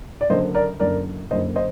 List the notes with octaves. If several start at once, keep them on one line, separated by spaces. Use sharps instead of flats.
D5
F#1 F#2 D3 C5 D#5
A#4 D5
F#1 F#2 D3 A#4 D5
F#1 F#2 D3 C5 D#5
C5 D#5